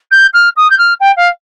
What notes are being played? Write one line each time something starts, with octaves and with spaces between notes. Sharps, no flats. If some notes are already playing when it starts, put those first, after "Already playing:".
G6
F6
D#6
G6
F6
G5
F5